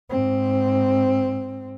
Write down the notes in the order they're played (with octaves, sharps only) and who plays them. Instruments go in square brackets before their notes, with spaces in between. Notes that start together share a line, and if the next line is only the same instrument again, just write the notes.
[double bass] G#2 C4